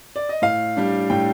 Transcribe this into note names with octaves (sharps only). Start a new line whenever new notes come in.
D5
D#5
A2 F5
G3 D4
A2 G5